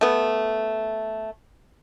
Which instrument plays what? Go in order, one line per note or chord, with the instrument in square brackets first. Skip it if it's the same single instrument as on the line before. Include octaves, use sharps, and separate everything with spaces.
[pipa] A3 B3